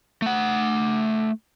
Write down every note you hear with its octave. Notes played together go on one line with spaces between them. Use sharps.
A3 F#5